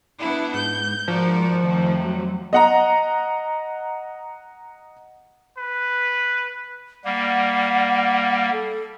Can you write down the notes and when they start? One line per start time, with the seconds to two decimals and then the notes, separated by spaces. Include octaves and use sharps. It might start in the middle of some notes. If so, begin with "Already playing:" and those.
0.18 B3 D4 E4
0.54 G#2 G6
1.08 G#2 F3 F#4 A#4 D5
1.63 F2 C3 D#3 A3
2.04 F#3
2.53 D#5 F#5 A#5
5.58 B4
7.05 G3 A#3 F#5
8.52 A4